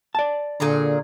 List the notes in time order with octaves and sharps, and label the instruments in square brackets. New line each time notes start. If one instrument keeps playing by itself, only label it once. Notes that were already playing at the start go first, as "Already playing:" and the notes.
[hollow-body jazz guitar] D5 A5
[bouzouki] A#2 G#4 A#5 [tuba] D3